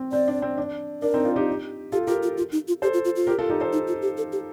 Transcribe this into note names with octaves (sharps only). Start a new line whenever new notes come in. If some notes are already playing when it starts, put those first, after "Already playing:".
Already playing: C4
C4 D5
D4
C4
D4
D4 A#4
C4 D#4
D4 F4
D#4 G4
F4 G4 A4
F4 G4 A#4
F4
F4
D#4
F4
G4 A4 C5
F4
F4
F4
G4 A#4
F4 A4
D#4 G4
A4 C5
D#4
F4
G4
A4
G4